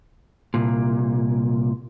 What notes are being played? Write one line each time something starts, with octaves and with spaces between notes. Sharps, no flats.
C2 A#2